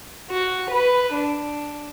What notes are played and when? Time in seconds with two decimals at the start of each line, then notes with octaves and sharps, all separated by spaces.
0.30 F#4
0.69 B4
1.13 D4